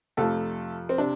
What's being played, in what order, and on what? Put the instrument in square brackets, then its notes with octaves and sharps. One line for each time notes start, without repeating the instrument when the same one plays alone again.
[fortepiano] F2 C3 F3 A3 A4
C4
C3 D4